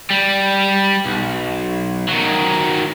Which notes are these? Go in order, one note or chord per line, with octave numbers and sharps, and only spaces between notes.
G3
B1
D#3 F#3